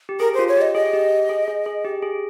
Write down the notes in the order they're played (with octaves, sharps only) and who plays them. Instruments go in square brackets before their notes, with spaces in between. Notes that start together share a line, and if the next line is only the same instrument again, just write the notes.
[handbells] G4
[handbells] G#4 [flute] A#4
[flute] C5
[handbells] F4
[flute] C#5
[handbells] G4 [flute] D#5
[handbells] G#4 [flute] D#5
[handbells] G4
G#4
G#4
G#4
G4
G#4